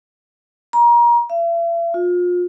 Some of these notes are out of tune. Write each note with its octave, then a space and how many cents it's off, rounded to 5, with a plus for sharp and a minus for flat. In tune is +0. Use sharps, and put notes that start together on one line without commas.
A#5 +30
E5 +45
F4 +30